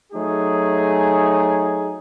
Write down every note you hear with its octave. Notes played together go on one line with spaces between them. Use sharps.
F#3 A3 D#4 G#4